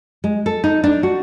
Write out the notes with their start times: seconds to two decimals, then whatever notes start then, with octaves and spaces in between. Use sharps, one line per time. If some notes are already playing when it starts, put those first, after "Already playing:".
0.24 G#3
0.46 A4
0.64 D#4
0.84 D4
1.03 F#4